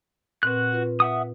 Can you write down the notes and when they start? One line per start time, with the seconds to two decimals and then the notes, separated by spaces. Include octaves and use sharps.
0.43 A#2 C4 F#4 B4 F#6
0.72 F4 B4
1.00 E5 F#5 D#6